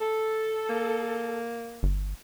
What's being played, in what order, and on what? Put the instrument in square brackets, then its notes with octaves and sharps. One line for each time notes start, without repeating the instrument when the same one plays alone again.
[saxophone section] A4
[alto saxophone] A#3
[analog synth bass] G1